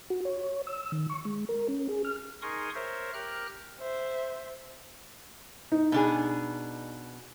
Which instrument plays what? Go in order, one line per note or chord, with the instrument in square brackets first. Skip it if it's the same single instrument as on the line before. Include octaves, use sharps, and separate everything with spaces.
[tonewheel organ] F#4
C#5
E6
D#3
C#6
G#3
A#4
C#4
G#4
F6
[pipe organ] D#4 G#4 A#4 C6 C#6 D#6
A#4 C5 C#5 E5
G4 A#4 F6 F#6
[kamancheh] C5 E5
[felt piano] D#4
[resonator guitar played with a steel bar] B2 D4 G#4